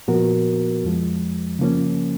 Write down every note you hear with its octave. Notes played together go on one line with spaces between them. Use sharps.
A#2 F3 B3 F#4 A#4
F2 F3 G#3
C#3 F3 A#3 C#4